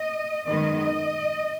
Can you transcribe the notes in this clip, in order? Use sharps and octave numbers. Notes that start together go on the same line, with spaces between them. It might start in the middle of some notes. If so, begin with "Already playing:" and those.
Already playing: D#5
F#2 D#3 G#3 B3 D#5